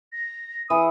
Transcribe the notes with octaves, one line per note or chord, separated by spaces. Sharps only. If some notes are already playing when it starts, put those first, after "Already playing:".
A#6
E3 D#6